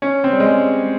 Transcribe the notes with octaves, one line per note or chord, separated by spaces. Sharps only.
C#4
C4
G3
G#3